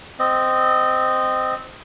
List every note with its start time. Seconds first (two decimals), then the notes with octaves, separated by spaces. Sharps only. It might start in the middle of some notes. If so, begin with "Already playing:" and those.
0.19 C4 D#5